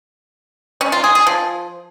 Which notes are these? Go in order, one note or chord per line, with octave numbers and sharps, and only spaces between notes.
C#4
F4
G#4
G#4
F3